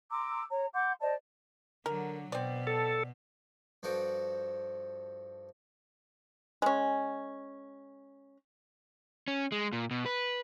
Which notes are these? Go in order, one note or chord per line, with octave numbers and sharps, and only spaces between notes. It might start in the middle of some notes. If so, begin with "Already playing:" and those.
A#5 C6 D6 E6
C#5 A#5
F#5 C6 D6 G6
C5 D5 D#5 A5
D3 F#3 A#4
B2 C4 D5
A4
G2 F3 F#4 A4 G5
G#3 C#4
C#4
G#3
A#2
B2
B4